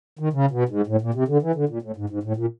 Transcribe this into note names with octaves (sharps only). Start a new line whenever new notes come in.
D#3
C#3
B2
G#2
A2
A#2
C3
D3
E3
D3
A#2
A2
G#2
G#2
A2
A#2